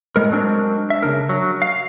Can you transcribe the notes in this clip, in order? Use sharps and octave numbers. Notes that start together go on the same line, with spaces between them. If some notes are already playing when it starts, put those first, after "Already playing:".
A2 G#3 A#4
F#3 G#3 C4 D4 A#4
E5
C#3 G#3 D4 A#4
F#3
F5